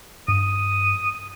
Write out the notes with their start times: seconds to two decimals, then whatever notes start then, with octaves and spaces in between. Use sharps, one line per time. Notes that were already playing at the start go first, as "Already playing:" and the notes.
0.28 G2 D#6